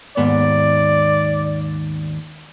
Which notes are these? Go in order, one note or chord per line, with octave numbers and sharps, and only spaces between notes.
D#2 G#2 B3 D5